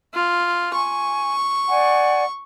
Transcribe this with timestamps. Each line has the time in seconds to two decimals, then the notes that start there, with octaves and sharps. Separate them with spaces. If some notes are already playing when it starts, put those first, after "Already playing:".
0.13 F4
0.74 G#5 C#6
1.69 D5 F#5 G#5